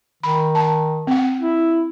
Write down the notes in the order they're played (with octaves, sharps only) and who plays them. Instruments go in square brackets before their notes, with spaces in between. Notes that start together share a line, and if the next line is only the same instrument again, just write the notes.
[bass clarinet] D#3 [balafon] B5
[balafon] A5
C4 F#5
[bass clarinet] E4